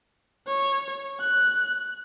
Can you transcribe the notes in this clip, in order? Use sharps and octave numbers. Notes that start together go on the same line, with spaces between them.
C#5
F#6